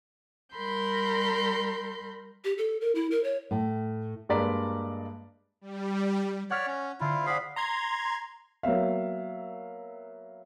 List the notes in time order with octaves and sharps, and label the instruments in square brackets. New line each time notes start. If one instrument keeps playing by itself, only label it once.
[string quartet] G3 A#4 B5 C6 G6
[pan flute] G4
A4
A#4
E4
A#4
C#5
[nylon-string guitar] A2
[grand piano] G2 G#3 A#3 D5 A#5 B6
[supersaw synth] G3
[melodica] C#5 D5 [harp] F#5 F6 B6
[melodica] C#4
[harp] D3 C5 [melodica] E4 F4
[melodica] G#4 F5 B5 [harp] C5 D5 F#5
[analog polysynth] A#5 C6 G#6
[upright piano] F#3 A#3 B3 E5 F5